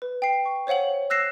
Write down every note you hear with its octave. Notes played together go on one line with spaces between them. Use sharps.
B4
G5 C7
C#6
C5 C#5 F5 F#5 F#7
E6 F#6 A#6 C7 E7